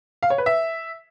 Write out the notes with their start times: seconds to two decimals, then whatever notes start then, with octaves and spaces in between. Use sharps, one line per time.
0.23 F5
0.30 C#5
0.38 B4
0.46 E5